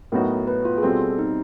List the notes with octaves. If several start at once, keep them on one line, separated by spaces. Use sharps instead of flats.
A2 F#3 B3 D#4 F#4 A#4
B4
F4
G#4
B2 G3 C4 A4
D#4